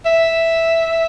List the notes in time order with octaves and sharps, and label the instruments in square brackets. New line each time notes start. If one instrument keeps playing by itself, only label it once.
[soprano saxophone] E5